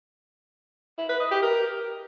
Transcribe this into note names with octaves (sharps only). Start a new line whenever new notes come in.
E4
B4
D#5
G4
A#4